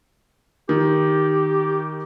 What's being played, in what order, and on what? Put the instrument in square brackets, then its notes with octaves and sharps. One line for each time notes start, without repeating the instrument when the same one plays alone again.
[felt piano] D#3 [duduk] G4